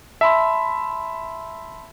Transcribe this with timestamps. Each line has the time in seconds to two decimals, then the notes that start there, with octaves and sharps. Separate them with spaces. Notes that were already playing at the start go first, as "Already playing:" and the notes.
0.21 E5 A5 B5 C6